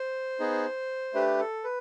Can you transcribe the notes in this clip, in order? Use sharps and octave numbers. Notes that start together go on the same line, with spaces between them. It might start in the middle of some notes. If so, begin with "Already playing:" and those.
Already playing: C5
B3 D#4 G#4
A3 D4 G4 B4
A4
B4